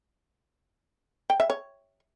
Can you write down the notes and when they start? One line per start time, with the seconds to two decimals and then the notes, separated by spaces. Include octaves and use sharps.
1.30 G5
1.40 E5
1.50 C#5